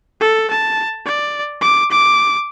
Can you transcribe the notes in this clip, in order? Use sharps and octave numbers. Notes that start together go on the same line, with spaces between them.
A4
A5
D5
D6
D6